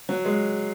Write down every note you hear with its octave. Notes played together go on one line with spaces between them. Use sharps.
F#3
G#3